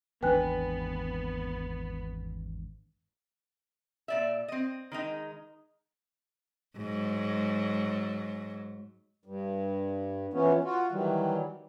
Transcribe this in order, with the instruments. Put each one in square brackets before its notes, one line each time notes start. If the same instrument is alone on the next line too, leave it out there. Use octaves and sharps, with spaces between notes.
[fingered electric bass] G#1 E2 D4 [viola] B3 [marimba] B4 [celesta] G5 G#5 F#6
[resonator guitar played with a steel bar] A#2 D5 E5
C4 D#5
D#3 G#3 D#4
[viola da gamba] G#2 F#3
[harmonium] G2
E3 F3 B3 C#4
F4 F#4
D#3 E3 F#3 G3